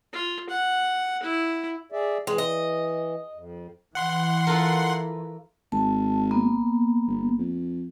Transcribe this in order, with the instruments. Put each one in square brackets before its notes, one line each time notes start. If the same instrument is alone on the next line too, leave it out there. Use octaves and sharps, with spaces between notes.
[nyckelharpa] F4
F#5
E4
[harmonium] G#4 D5 E5
[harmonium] E3 [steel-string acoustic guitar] G#3
[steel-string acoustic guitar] D#5
[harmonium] F2
[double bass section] E3 [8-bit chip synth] F#5 C6
[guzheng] F4 A4 A#4
[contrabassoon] G#1 [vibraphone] A5
[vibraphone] A#3 B3
[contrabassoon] G1
F2